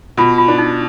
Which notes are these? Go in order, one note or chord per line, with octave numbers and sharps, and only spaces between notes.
B2 F4
F4
D4
D#4